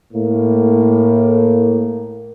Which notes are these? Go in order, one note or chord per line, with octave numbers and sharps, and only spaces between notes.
A2 A#3